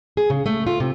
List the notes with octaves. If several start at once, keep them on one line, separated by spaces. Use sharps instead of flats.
G#4
C#3
A3
F4
C3